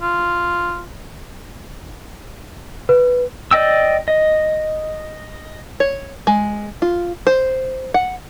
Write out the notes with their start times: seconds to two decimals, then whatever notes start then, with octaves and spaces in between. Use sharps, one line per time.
0.02 F4
2.89 B4
3.51 D5 D#5 G5 E6
4.08 D#5
5.80 C#5
6.27 G#3
6.82 F4
7.27 C5
7.94 F#5